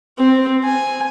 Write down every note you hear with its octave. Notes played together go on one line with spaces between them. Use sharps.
C4
G#5